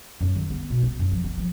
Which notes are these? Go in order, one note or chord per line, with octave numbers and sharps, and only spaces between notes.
F#2
D#3
B3
B2
B3
F#2
F3
B3
F3